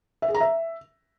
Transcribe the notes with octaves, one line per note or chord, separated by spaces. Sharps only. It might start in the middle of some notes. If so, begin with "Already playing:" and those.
E5
G#4
A#5
E5